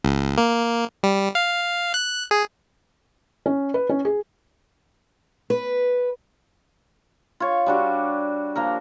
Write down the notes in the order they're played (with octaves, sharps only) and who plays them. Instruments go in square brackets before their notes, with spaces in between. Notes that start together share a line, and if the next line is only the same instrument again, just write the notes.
[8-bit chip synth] C#2
A#3
G3
F5
F#6
G#4
[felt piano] C#4
B4
C#4
G#4
[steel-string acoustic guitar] B4
[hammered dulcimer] F4 C#5
G3 D4 F#4
F3 A#3 A#4